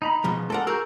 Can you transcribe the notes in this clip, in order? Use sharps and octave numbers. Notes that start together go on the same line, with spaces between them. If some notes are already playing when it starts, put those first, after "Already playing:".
D#4 A#5 B5
B2 F3 G#3
G#3 A4 A#4 D5 F#5
F#4 G#4 A#4 E6 G6